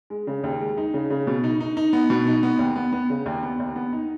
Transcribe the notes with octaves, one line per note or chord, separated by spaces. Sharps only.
G#3
C#3
D#2
G#3
D#4
C#3
C#3
B2
D#4
D#4
D#4
B3
B2
D#4
B3
D#2
B3
B3
C#3
D#2
B3
D#2
B3
D#4